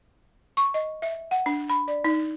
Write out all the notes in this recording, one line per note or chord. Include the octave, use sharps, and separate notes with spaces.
C#6
D#5
E5
F#5
D4
B5
D5
D#4